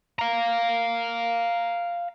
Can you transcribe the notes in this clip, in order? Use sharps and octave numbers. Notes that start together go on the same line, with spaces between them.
F5 A#5